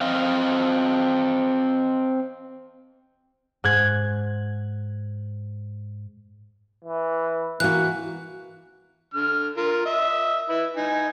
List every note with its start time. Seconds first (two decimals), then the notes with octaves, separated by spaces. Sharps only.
0.01 C4 D#5 F5
3.64 G#2 F#6 G#6
6.85 E3
7.60 E3 A#3 F#4 F#6
9.14 D3 F6
9.57 F4 A#4
9.85 D#5 E5
10.49 E4 B4
10.77 D#4 B4 G#5